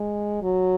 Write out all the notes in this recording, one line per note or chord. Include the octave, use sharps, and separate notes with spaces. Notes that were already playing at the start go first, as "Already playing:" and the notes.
Already playing: G#3
F#3